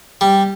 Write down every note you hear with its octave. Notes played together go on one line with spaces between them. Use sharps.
G3